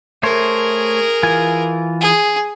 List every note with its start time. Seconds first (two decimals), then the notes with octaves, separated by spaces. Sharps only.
0.23 A3 G#4 A#4 C5 C#5
1.23 E3 F4 G#5
2.01 G#4